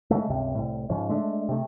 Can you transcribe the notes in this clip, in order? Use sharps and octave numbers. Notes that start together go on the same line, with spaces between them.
C#3 G#3 A3
C#2 G2 C3
C2 A2
G#2 C#3 F3
G#3 A3 D4
C3 A3